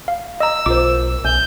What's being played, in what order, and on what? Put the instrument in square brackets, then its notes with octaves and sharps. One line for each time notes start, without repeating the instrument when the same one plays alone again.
[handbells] F5
[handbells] D#5 A#5 [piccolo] E6
[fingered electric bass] B1 [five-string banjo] F4 A#4 C5 [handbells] D6
[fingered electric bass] B1 [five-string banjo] G#5 [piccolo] G6